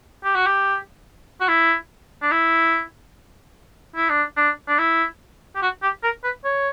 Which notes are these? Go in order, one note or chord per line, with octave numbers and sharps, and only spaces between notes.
G4
F#4
G4
F#4
E4
D4
E4
E4
D4
D4
D4
E4
G4
F#4
G4
A#4
B4
C#5